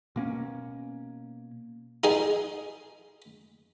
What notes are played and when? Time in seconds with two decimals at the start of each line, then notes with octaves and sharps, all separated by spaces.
0.16 B2 A#3 C#4
2.04 D#4 G#4